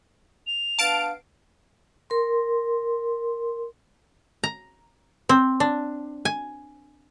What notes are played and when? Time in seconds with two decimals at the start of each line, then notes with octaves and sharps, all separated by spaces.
0.47 F7
0.79 B3 D4 F5 A5 D7
2.10 A#4 C6
4.44 A#5
5.29 C4
5.60 D4
6.25 G#5